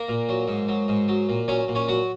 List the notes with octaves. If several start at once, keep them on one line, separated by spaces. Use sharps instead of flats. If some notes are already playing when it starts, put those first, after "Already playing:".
Already playing: A#3 A#4
A#2
F#3
G#2
F#3
G#2
F#3
A#2
F#3 C#4 C#5
A#2
C#4 C#5
F#3 F#4 F#5